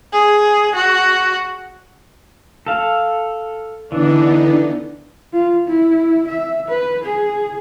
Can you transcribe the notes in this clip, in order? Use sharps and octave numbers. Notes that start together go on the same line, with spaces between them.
G#4
F#4
A4 F5
D3 E3 B3 D4 D#4
F4
E4
E5
B4
G#4